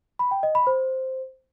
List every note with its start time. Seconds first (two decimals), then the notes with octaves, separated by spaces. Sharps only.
0.19 B5
0.31 G5
0.43 D#5
0.55 B5
0.67 C5